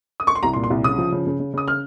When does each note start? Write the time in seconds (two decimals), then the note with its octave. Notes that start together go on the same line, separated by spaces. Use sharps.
0.20 D#6
0.27 C#6
0.35 C6
0.43 C2 A#5
0.53 C6
0.56 A#2
0.64 C6
0.70 C2
0.84 C#3 D#6
0.98 F3
1.12 C#3
1.27 C#3
1.40 C#3
1.54 C#3 D#6
1.68 F6